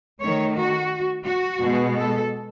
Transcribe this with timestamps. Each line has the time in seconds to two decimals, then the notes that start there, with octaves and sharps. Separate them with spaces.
0.21 D#3 A3 C#5
0.57 F#4
1.26 F#4
1.61 B2 G#3 B3
1.96 A4